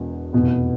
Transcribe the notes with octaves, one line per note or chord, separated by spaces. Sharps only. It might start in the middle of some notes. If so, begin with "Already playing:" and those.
Already playing: E1 E2 B2
F1 E2 B2 B3